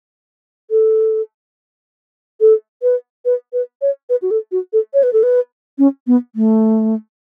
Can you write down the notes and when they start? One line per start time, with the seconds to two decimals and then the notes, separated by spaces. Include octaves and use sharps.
0.71 A4
2.41 A4
2.82 B4
3.25 B4
3.53 B4
3.81 C#5
4.09 B4
4.22 F#4
4.31 A4
4.52 F#4
4.73 A4
4.94 C#5
5.03 B4
5.13 A4
5.23 B4
5.78 C#4
6.07 B3
6.35 A3